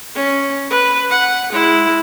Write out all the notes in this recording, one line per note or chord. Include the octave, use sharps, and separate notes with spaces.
C#4
B4
F#5
G#3 E4